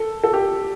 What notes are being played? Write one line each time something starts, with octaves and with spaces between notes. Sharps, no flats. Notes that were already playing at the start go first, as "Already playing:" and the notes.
Already playing: A4
A4
G4